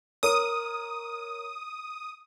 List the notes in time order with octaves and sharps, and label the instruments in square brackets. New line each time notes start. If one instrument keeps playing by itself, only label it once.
[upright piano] A#4 C#5 [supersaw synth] D#6